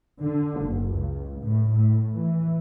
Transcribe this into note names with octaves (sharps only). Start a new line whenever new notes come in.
D3
F#1
C#2
A2
A2
E3